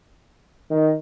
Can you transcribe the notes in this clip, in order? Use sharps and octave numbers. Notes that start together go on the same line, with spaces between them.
D#3